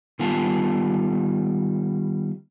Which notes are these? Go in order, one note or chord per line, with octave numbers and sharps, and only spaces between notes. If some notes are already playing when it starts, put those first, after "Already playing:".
D#3 G3 B3 F4 G#5 A5